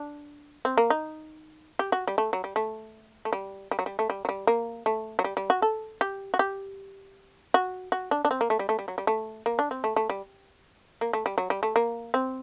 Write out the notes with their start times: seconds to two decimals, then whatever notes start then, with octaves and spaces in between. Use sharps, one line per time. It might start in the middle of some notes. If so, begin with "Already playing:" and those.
Already playing: D4
0.65 C4
0.77 A#3
0.90 D#4
1.79 G4
1.92 F#4
2.07 G3
2.18 A3
2.33 F#3
2.44 G3
2.56 A3
3.25 A3
3.33 G3
3.71 G3
3.79 F#3
3.86 G3
3.99 A3
4.10 G3
4.25 F#3
4.29 G3
4.47 A#3
4.86 A3
5.19 F#3
5.24 G3
5.37 G3
5.50 F#4
5.62 A4
6.01 G4
6.34 F#4
6.39 G4
7.54 F#4
7.92 F#4
8.11 D4
8.25 D4
8.31 C4
8.41 A#3
8.50 A3
8.59 G3
8.69 A3
8.79 G3
8.88 F#3
8.98 G3
9.07 A3
9.46 A#3
9.59 D4
9.71 C4
9.84 A3
9.96 A3
10.10 G3
11.01 A#3
11.13 A3
11.26 G3
11.38 F#3
11.50 G3
11.63 A3
11.76 A#3
12.14 C4